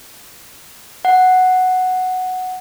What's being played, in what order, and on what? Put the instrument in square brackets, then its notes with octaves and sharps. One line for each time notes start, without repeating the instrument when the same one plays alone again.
[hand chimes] F#5